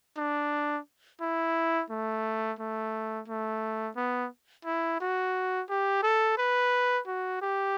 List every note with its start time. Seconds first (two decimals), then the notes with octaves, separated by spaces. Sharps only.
0.17 D4
1.21 E4
1.90 A3
2.59 A3
3.28 A3
3.97 B3
4.65 E4
5.01 F#4
5.70 G4
6.03 A4
6.38 B4
7.07 F#4
7.42 G4